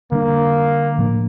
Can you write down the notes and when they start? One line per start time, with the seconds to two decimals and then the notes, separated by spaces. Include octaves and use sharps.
0.12 D3 G3 A#3 D4
0.98 A2 F3 A#3 D4